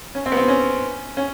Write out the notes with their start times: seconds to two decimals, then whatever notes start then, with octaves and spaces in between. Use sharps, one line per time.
0.15 C#4
0.26 C4
0.32 B3
0.37 C4
0.48 C#4
1.17 C#4